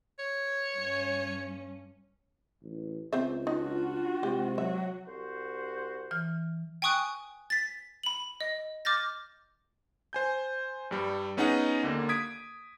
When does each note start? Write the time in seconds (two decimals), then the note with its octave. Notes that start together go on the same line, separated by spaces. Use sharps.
0.19 C#5
0.77 G2 C#4
2.62 A1
3.13 C#2 C4 C5 E5
3.47 D4 D#4 F4 F#4
4.23 C3 G#3 G4
4.58 F#3 F#4 E5
5.07 C2 F#4 C5
6.11 E3 F6
6.82 G5 G#5 C#6 D#6 F#6
7.50 A6 B6
8.03 B5 F#7
8.41 D#5
8.85 D6 F6 G6 A6 A#6
10.13 C5 G#5 G6
10.91 G2 G3
11.37 B3 C#4 D#4 G#4 D#5 F#5
11.83 D#2 D3 A#3
12.09 D#6 G#6 B6 D7